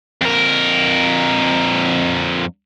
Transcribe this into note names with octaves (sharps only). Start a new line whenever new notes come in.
F2 A#4